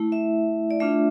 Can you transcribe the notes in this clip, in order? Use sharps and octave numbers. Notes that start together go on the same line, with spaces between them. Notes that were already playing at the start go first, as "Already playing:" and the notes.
Already playing: A3 E4
E5
D5
A3 D4 F4 E5